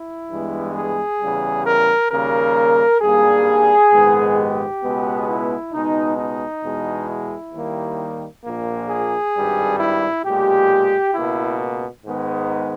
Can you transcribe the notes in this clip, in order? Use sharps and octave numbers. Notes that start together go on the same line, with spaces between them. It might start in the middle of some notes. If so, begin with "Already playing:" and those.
Already playing: E4
G2 E3 G#3 B3
G#4
E2 C#3 G3
A#4
D#2 C#3 G3 A#3 A#4
G#1 G2 G3 A#3 G#4
A#1 G#2 D#3 G#3 B3
G4
C#2 B2 G#3 B3
E4
C#2 B2 G#3 B3 D#4
D#4
E2 B2 G#3
E4
D#2 D#3 G3 A#3
A#1 A#2 A#3
G#4
G#1 G2 G3
E4
B1 A#2 G#3 G4
C#2 B2 A#3 E4
G#2 D#3 G#3 B3